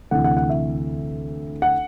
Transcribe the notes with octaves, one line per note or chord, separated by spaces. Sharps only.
D2 C3 E3 F#5
F#5
F#5
E5
F#5